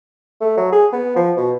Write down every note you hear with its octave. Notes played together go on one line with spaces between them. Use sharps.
A3
F#3
G#4
B3
F3
B2